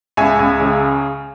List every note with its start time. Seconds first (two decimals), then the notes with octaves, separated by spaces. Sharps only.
0.17 C#2 E5 G#5
0.39 C#2
0.59 C#3